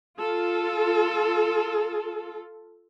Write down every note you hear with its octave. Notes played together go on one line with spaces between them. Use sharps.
F4 A4